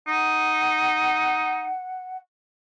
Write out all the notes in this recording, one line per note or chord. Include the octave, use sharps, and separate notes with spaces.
D#4 F#5